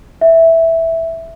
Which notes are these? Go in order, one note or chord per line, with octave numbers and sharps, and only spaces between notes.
E5